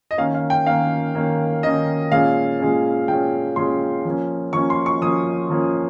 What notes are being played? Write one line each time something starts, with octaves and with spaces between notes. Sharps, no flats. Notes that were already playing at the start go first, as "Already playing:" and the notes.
D#5
D#3 A#3 C#4 F5
F5
G5
D#3 A#3 C#4 F5
D#3 A#3 C#4
D#3 A#3 C#4 D#5
A#2 G#3 C#4 F5
A#2 G#3 C#4
A#2 G#3 C#4 G5
A#2 G#3 C#4 C6
F3 A#3 C#4
F3 A#3 C#4 C#6
C6
C#6
F3 A#3 C#4 D#6
F3 A#3 C#4